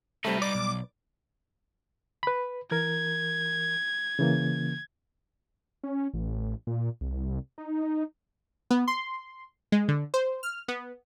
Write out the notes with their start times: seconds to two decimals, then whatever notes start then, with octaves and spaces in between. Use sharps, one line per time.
0.25 C3 G3 A3 D#4 B4
0.42 D5 D6
0.55 B1
2.23 B4 B5
2.71 E3 A#4 G#6
4.19 C#3 E3 A#3
5.84 C#4
6.14 A1
6.67 A#2
7.01 C2
7.58 D#4
8.71 B3
8.88 C6
9.72 G#3
9.88 D3
10.14 C5
10.43 F6
10.68 B3